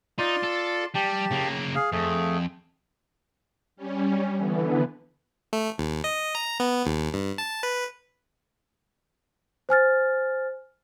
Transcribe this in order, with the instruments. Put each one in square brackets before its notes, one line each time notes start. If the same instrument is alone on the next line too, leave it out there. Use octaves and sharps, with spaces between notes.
[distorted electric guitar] D#4 [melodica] F4 D5 C6
[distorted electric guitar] A4
[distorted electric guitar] G3 [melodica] G4 A5
[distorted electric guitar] C#3 A#3
[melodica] G#4 F5
[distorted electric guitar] F2 [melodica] A3 G#4
[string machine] G3 C#4
D3 E3 B3
[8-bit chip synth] A3
D#2
D#5
A#5
B3
D#2
G2
A5
B4
[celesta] C5 G#5 F6 A6